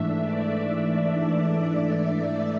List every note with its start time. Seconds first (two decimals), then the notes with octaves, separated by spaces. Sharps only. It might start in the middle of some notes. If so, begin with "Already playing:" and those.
Already playing: G#2 E3 A3 D4 E5
0.21 D5